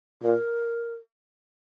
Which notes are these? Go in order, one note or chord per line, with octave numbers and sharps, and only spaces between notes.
A#2 A#4